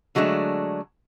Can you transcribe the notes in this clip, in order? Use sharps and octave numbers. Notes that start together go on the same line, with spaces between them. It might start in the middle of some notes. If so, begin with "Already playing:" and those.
D3 F#3 G#3 A3 D4